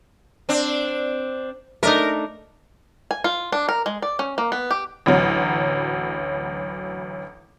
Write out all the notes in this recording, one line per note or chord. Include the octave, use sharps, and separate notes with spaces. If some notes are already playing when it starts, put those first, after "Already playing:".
C4 D4
A3 D4 D#4 A#4
G#5
F4
D4
A#4
G#3
D5
C#4
A#3
B3
G4
A1 D2 F#3